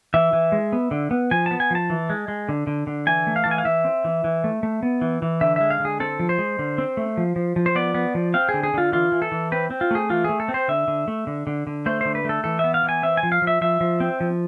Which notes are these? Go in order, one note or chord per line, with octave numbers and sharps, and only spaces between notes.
E3 E5
E3
G#3
B3
D3
B3
F3 G#5
B3 A5
G#5
F3 A5
E3
G#3
G#3
D3
D3
D3
E3 G#5
A3
F5
E3 A5
G#5
F5
E3 E5
C4
E3
E3
A3
A3
B3
E3
E3
D3 E5
G#3 E5
F5
D3 G#4
C4 A4
F3
C5
G#3
D3
C4
A3
F3
F3
F3
C5
B3 D5
B3
F3
C4 F5
G#4
D3
G#4
D3 F4
E3 F4
E3
A4
E3
C4 B4
C4
F4
A3 G#4
E3 F4
A3 G#4
A4
C4
C5
D3 E5
D3
A3
D3
D3
D3
A3 C5
D3 C5
B4
A3 A4
E3 A4
B3 E5
F5
E3
G#5
C4 E5
G#5
F3
F5
F3
E5
F3 E5
F3
C4
F3